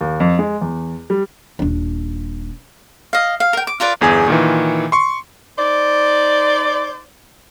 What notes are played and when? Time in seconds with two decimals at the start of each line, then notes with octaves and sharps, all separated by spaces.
0.01 D#2
0.20 F2
0.39 G#3
0.61 E2
1.10 G3
1.59 D#1 D4
3.13 D#5 F5
3.40 F5
3.53 A#4 G5
3.67 D6
3.80 F4 A#4 B4 D5
4.01 G1 E2 G#4 G#5
4.28 A#2 D#3 E3
4.92 C6 C#6
5.58 D#4 C5 D5